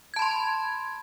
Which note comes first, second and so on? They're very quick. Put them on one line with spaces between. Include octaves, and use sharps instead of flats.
G#6 A5 B5 C6